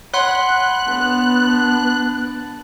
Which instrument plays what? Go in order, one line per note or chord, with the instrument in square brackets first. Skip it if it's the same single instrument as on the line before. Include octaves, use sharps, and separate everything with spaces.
[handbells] C#5 F#5 C6 [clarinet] B5 [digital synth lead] F#6
[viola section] B3 [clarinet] D4